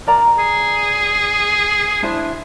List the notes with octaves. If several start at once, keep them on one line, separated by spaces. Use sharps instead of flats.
A#4 D5 A#5
G#4
D4 E4 C5